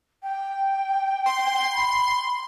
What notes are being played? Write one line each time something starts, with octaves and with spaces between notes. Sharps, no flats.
G5
C6
B5